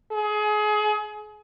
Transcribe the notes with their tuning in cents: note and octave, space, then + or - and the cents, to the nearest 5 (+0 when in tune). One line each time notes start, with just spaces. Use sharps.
G#4 +30